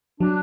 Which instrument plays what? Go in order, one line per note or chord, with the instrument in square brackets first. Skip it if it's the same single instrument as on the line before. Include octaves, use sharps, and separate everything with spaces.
[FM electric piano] F#3 [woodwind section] D4